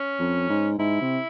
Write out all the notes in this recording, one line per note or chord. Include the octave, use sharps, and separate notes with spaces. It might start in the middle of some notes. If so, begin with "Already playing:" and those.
Already playing: C#4
F2
G#2
G#2 E4
C3